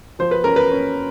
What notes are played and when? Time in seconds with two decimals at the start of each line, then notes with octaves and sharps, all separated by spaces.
0.19 F3 C5
0.31 B4
0.44 C#4 A#4
0.56 B4
0.71 C#4